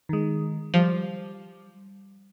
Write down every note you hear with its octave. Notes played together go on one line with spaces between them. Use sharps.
D#3 G#3
F3 G3